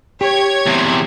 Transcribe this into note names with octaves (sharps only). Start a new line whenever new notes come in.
G4 C#5 G#6
E2 C3